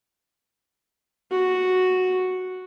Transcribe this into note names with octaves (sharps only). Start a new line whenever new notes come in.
F#4